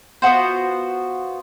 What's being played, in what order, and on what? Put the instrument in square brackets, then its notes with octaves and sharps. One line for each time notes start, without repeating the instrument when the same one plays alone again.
[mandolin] B3 F4 F#4 C5